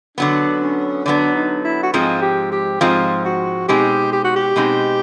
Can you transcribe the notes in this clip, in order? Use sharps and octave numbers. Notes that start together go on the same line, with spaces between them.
D3 F#3 B3 D4
C#4
D3 F#3 B3 D4
D#4
E4
F#4
G#2 F3 G#3 C4 F4
G4
G4
G#2 F3 G#3 C4 F4
F#4
B2 G#3 C4 D#4 G4
G4
F#4
G4
B2 G#3 C4 D#4